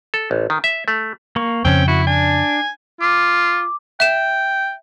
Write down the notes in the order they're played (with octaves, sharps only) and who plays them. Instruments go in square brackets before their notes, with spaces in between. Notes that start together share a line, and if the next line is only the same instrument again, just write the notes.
[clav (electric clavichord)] A4
A1
D#3
E5
A3
[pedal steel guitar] A#3 C#6
[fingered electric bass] F2 C#3 [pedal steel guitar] C4 C#4 [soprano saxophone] G5
[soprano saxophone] E4 [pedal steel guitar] F#4
[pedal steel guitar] D4 [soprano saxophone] G#5
[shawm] F4 [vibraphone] D6
[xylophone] E5 E7 [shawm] G5